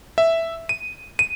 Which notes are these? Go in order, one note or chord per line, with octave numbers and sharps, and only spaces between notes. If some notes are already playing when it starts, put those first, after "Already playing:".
E5
D#7
D#7